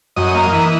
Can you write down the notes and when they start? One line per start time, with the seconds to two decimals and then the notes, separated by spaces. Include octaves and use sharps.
0.16 F#2 D#5
0.35 A#3
0.53 E3